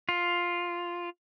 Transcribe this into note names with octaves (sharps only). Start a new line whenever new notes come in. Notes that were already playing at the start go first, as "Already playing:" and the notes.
F4